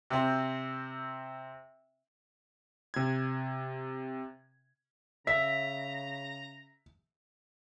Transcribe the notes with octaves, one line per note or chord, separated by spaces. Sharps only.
C3 C4
C3 G#6
C#3 E5 A#5 B6